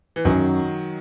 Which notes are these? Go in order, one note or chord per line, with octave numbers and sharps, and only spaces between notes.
E3
F#2 D#3 F#3